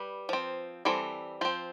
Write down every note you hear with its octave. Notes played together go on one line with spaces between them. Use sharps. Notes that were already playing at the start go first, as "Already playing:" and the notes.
Already playing: G3 B4
F3 C4
E3 G3 C4 A4
F3 C4 C5